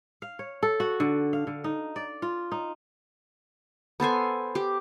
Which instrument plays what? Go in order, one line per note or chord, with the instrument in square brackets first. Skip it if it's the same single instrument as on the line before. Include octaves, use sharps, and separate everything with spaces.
[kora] F5
C#5
A4
F#4
D3
F5
D3
D#4
D5
F4
D#4
[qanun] B3 A4 C5 G#5
G4